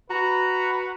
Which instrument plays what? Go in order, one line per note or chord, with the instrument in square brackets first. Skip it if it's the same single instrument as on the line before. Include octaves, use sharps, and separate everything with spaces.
[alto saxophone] F#4 [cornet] B4 [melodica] A#5